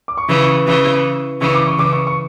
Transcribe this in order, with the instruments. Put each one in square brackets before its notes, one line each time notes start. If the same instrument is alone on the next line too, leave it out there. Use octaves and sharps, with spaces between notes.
[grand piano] D6
C#6
[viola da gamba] C#3 E3
[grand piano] C#6
[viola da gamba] C#3 E3
[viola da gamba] C#3 E3 [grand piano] C#6
[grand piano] D6
C#6
[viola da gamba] C#3 E3 [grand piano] D6
[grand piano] C#6
C#6